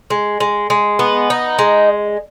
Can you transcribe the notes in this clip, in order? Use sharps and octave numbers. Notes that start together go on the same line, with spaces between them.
G#3
G#3
G#3
B3
D#4
G#3